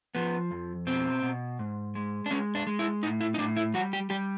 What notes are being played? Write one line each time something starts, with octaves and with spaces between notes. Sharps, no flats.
F3 B3
F2
B2 C4
B2
G#2
G#3
D4
G#3 C#4
D4
G#3
E4
A2 D#4
E4
D#4
A2 D4
E4
G3 F#4
G4
G3 G4